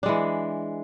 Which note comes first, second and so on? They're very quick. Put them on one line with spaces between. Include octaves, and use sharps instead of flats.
D4 G#3 E3